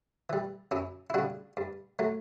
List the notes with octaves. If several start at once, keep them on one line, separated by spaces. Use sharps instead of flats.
E3 G3
F#2 C#4 E4
E4
C#3 G3 D4 F#4
G2
F#3 A3